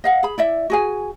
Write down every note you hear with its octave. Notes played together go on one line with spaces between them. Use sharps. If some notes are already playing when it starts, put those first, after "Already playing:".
D#5 F5 F#5
G#4 B5
E4 D5 E5
F#4 G#4 G#5